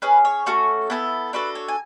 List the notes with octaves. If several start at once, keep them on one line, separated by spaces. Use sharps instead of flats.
C#4 G#4 B4
C#5
A3 C#4 F#4 A4
B3 E4 A4
D4 F#4 A4 B4
C#5
G#5